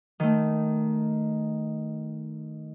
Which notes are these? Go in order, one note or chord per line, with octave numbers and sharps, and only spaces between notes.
D#3 A3